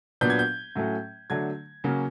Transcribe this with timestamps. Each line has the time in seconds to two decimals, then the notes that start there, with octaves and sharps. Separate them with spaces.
0.21 A#2 F#3 B3 D4 G6
0.30 G#6
0.39 G6
0.76 A2 F#3 A3 C#4
1.30 D3 F#3 A3 D4 G#6
1.84 C#3 F#3 A#3 C#4